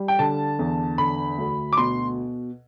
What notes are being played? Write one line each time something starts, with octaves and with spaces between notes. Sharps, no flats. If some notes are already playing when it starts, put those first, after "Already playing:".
Already playing: G3
G5
D3 A5
E2
D3 B5
D2
D6
B2 C6